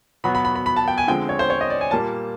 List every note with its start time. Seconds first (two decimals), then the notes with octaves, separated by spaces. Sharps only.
0.24 B2 F#3 B3 B5
0.35 B5
0.45 B5
0.55 B5
0.66 B5
0.76 A5
0.88 G5
0.98 G#5
1.07 D3 F3 G#3 C4 G5
1.29 C#5
1.39 C5
1.50 C#5
1.61 D#5
1.70 D5
1.81 G#5
1.91 A#2 G3 A#3 A5